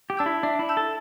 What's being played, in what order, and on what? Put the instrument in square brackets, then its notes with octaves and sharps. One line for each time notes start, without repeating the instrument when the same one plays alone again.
[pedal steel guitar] G4
[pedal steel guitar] D4 [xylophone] A5 E6 G6
[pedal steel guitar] E4
[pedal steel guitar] D4 [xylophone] E5
[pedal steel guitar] E4
[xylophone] A5 E6 G6
[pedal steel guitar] A4